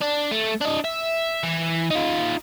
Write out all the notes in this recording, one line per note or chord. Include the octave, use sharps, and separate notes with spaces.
D4
A3
D4 D#5
E5
E3
D#4 F4